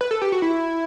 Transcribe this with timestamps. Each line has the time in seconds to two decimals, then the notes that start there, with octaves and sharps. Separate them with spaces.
0.01 B4
0.11 A4
0.22 G4
0.32 F#4
0.42 E4